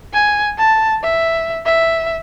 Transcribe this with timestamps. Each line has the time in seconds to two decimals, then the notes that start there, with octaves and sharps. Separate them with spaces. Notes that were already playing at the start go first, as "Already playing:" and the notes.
0.14 G#5
0.59 A5
1.03 E5
1.66 E5